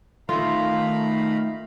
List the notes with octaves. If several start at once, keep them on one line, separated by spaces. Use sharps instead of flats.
D#3 A3 F4 F5 A#5 B5